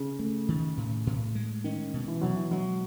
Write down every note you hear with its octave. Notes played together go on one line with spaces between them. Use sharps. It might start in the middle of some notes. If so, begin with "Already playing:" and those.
Already playing: C#3
A3
D#3
A2
A2
G#3
D#3 C#4
B2
E3
B2 F#3
E3
F#3 G#3